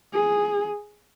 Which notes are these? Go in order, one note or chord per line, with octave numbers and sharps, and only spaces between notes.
G#4